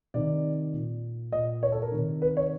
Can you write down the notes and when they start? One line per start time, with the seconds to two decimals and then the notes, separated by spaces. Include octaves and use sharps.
0.14 C3 D#3 D5
0.73 A#2
1.32 A#2 D#5
1.63 C#5
1.72 A4
1.82 A#4
1.92 C3 D#3
2.22 B4
2.37 C#5